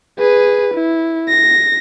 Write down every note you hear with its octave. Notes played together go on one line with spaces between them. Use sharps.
G#4 B4
E4
A#6